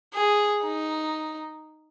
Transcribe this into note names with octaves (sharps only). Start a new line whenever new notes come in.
G#4
D#4